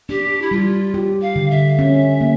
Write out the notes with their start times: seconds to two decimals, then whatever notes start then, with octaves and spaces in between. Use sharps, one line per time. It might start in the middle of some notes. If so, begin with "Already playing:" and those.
0.09 D4 G4
0.42 E4
0.51 G3 F4
0.94 G4
1.22 F5
1.36 D3
1.50 E5
1.79 C#4
2.21 A#3